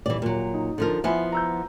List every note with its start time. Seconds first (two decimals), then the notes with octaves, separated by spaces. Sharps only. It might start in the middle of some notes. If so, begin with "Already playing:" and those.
0.06 D#1 E3 D5
0.22 A#2 F#3
0.54 D#4
0.78 D3 F3 A#4
1.04 F3 B3 E4 E5 G#5 B5
1.33 A#5 E6 G6